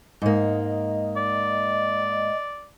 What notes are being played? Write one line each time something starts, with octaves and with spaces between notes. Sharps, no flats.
G#2 A#3 D#5
D5